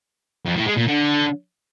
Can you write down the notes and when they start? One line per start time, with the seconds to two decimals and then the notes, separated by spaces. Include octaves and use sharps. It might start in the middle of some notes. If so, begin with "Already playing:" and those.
0.46 F2
0.56 A2
0.67 G#3
0.77 A#2
0.88 D3